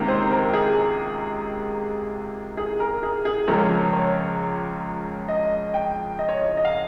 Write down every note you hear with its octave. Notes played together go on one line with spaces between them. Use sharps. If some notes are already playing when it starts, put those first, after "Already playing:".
Already playing: C#2 C3 D#3 A#3
C5
A#4
G4
G#4
G#4
A#4
G#4
G#4
C#2 C#3 F3 A#3 C#4 C#5
C#5
D#5
G5
D#5
C#5
D#5
D#5
F5